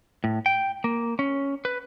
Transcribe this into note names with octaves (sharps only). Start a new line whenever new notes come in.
A2
G5
A#3
C#4
B4